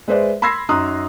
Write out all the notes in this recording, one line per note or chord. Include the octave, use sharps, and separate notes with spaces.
G#3 B4 C5 D5 E5
B5 C6 E6 G#6 A#6 C7
F#2 D#4 A#5 C6 D#6 F#6